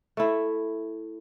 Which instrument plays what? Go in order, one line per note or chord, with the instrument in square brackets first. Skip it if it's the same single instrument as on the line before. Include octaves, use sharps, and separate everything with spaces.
[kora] A3 E4